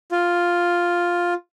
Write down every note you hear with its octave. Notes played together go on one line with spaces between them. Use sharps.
F4